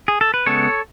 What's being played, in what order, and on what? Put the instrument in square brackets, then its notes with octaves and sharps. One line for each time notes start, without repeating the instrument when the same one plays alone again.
[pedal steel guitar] G#4
A4
B4
C#3 G#3 B3 A4 C#5